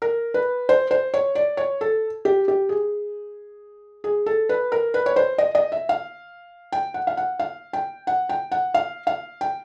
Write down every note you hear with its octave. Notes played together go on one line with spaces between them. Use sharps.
A#4
B4
C5
C5
C#5
D5
C#5
A4
G4
G4
G#4
G#4
A4
B4
A#4
B4
C#5
C5
D#5
D#5
E5
F5
G5
F#5
F5
F#5
F5
G5
F#5
G5
F#5
F5
F5
G5